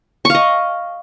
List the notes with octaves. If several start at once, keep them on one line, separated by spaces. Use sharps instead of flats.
D#5 F5 C#6